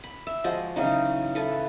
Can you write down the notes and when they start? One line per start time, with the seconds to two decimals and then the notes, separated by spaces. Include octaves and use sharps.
0.04 B5
0.27 E5
0.44 F3 G#3 F#4
0.76 C#3 E3 F#3 D#4
1.35 E4 A4 B4